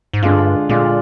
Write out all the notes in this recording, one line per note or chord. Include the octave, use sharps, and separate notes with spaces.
G#2
G2 D3 G#3 D4 F4
A#2 D3 G#3 D4 F4